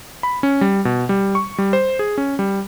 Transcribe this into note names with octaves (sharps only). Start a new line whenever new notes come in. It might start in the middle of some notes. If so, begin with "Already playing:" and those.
B5
C#4
G3
B2
G3
C#6
G3
C5
G#4
C#4
G3